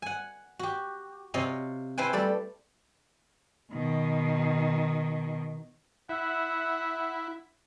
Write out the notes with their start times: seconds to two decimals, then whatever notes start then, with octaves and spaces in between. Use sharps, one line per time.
0.02 F#5 G#5
0.59 F#4 G4
1.34 C3 F4 C#5 D#5
1.98 E4 B4 C5 G5 G#5
2.13 G3 A3 A4 D5
3.72 B2 D#3
6.09 E4 E5 F#5